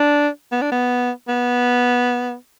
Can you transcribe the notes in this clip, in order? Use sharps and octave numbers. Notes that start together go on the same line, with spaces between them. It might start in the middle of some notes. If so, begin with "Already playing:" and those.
Already playing: D4
B3
D4
B3
B3